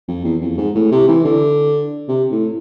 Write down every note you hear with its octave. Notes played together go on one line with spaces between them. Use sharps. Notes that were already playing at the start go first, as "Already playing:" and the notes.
F2
E2
F2
G#2
A2
C3
E3
D3
C3
A2